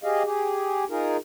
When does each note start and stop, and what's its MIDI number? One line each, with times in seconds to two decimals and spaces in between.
0.04 0.23 67
0.04 0.23 68
0.04 0.23 75
0.04 0.23 77
0.24 0.84 67
0.24 0.84 68
0.90 1.17 63
0.90 1.17 65
0.90 1.17 68
0.90 1.17 70